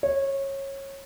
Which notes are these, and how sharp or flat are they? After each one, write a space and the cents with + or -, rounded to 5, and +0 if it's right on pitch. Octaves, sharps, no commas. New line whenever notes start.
C#5 -20